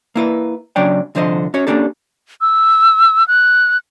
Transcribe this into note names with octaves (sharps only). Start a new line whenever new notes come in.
A#3 E4 B4
C#3 F#3 C#4 D4 D5 G5
C2 D3 F3 C5 D5 D#5
C#4 F#4 C#5
A#3 B3 C#4 D4 G4 A4
E6
F#6